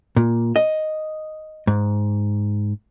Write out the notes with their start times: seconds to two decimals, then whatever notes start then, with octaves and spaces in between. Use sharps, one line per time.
0.16 A#2
0.56 D#5
1.67 G#2